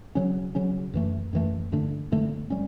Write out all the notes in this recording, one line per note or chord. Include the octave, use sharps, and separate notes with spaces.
C#3 F#3 C#4
C#3 F#3 C#4
F#2 E3 A3
F#2 E3 A3
G2 D3 A3 D4
G2 D3 A3 D4
G3 C#4